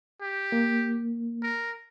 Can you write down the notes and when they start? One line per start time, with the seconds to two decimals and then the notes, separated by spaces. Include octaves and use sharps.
0.21 G4
0.52 A#3
1.43 A#4